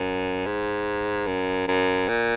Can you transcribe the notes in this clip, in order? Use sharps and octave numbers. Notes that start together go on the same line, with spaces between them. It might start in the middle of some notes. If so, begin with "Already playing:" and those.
Already playing: F#2
G#2
F#2
F#2
A#2